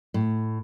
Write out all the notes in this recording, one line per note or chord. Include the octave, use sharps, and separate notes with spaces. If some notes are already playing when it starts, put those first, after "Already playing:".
A2